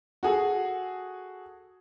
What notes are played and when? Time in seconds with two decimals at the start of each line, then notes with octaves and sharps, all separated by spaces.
0.23 F#4 G#4 A4